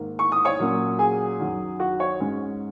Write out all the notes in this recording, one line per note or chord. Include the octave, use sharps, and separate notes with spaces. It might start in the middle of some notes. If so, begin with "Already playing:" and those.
Already playing: G#2 D#3 A#3
C#6
D#6
C#5 C#6
A#2 F#3 A#3 C#4
G#4 G#5
F#2 D#3 F#3
F#4 F#5
C#5
G#2 G#3 C#4